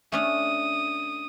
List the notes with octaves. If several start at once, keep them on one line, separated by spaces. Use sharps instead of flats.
A3 C#4 D4 D#6